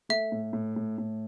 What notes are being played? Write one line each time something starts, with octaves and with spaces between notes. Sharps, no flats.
A3 E5
A2
A2
A2
A2